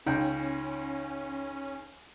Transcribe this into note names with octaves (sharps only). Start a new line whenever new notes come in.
C#2 C#4 D#4 G5